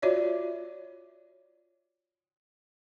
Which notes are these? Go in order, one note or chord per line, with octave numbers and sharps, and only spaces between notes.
F4 F#4 C#5 D5 E5